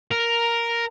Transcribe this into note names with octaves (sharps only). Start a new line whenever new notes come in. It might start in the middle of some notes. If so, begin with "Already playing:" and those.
A#4